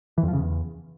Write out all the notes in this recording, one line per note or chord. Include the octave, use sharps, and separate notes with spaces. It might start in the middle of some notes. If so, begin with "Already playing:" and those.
E3
F2
F3
C#3
E2